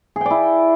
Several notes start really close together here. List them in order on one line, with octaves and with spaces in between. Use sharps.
G#4 G5 D5 E4